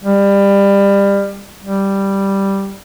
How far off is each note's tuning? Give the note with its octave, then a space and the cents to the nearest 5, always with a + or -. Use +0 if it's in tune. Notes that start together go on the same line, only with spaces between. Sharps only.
G3 +25
G3 +0